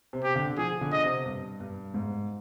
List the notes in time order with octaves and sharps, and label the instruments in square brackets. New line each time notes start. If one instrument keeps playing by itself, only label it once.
[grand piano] C3
[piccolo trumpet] G4
[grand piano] D3
[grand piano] F3 [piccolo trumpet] G#4
[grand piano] D3
[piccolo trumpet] D#5
[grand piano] C3
G2
G2
G#2